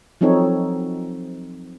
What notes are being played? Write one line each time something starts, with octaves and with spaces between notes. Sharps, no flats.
F3 F#3 C4 D#4 A4 C#5